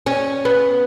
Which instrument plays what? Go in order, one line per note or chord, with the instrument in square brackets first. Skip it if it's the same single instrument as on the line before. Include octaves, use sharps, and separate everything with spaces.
[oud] C#4
B3